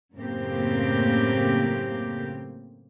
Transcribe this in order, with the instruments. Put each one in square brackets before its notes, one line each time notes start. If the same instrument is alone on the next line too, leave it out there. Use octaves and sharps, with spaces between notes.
[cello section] F#2 A2 C#3 A#3 C4 G4